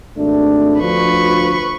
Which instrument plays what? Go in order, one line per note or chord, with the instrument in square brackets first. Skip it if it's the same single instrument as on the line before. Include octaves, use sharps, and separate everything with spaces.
[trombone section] G#1 A3 D4
[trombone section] D2 F3 [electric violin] B4 C#6